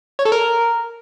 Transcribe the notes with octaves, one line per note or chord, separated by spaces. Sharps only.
C#5
A4
A#4